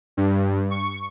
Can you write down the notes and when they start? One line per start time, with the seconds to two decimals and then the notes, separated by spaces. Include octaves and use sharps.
0.17 G2
0.70 C#6